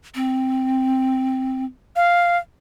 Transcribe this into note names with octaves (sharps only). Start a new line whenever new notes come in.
C4
F5